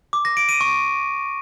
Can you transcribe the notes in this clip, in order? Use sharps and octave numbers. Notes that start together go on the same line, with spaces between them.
D6
A#6
D7
D#7
C#6